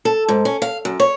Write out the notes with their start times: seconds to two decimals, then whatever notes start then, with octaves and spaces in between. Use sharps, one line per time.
0.05 A4
0.29 G#2
0.45 C#4
0.62 F5
0.85 F#2
1.00 C#5